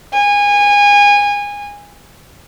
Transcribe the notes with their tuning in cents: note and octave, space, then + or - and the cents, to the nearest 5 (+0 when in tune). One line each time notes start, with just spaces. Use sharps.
G#5 -25